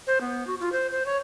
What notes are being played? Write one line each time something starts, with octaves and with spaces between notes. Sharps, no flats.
C5
B3
F#4
F4
C5
C5
C#5